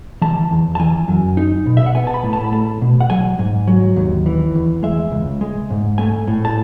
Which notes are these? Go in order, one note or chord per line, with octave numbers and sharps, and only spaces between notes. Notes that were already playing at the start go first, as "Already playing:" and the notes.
E3 A5
E2
A5
E3 G#5
F#2
D#4
B2
E5
F#5
B3 G#5
A5
B5
A2
A5
B5
A3 A5
B2
F#5
F#3 G#5
G#2
F#3
D#2
E3
E2
G#3 E5
C#2
G#3
G#2
A3 G#5
A2
A5